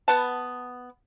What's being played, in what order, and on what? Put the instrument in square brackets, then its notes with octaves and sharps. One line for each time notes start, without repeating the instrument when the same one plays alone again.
[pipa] B3 F#5 A5